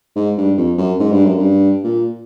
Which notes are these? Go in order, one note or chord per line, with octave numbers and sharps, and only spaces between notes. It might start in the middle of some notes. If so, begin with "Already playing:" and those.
G#2
G2
F2
F#2
G#2
G2
F#2
G2
A#2